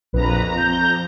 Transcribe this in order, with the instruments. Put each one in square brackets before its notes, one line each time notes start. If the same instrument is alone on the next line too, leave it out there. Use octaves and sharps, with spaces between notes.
[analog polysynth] A#1 B4 [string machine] F2 A#5
[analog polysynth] G6